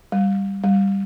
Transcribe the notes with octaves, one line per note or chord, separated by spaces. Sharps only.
G3
G3